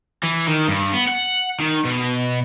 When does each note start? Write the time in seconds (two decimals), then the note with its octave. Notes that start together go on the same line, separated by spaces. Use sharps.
0.23 E3
0.47 D#3
0.68 G2
0.93 B3
1.09 F#5
1.60 D#3
1.85 B2